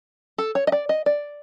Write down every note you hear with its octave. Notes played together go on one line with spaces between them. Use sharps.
A4
C#5
D#5
D5
D#5
D5